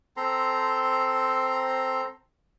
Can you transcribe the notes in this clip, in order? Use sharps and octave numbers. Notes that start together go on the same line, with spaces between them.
C4 A4 A#5 C6